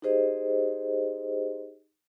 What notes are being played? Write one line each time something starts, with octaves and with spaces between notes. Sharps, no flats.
D#4 G4 G#4 C5 D#5